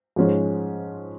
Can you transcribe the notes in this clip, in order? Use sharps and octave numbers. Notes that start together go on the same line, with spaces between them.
G#2 F3 G#3 C#4